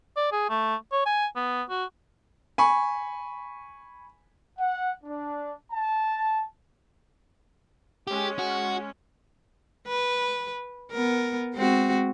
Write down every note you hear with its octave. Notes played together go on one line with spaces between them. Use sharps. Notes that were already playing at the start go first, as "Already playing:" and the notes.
D5
G#4
A3
C#5
G#5
B3
F#4
G#5 B5 C#6
F#5
D4
A5
G#3 C#4 G4
F#4
B4
B3 A#4
G#3 C4 F#4